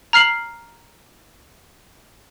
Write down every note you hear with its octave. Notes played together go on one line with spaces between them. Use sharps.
A#5 F6 C7 F#7